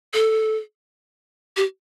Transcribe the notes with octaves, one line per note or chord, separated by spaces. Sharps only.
A4
G4